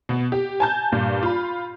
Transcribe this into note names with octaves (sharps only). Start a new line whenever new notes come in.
B2 B3
G4
G#5 A5 G6
G2 A#2
F4 B5